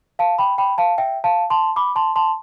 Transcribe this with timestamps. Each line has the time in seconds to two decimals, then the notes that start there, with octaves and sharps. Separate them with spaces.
0.19 F5 A5
0.39 G5 B5
0.58 G5 B5
0.78 F5 A5
0.98 E5 G5
1.24 F5 A5
1.50 A5 C6
1.76 B5 D6
1.96 A5 C6
2.16 A5 C6